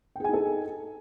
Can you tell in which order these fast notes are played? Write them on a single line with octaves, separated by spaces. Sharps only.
G5 G#4 G#5 D#4 A4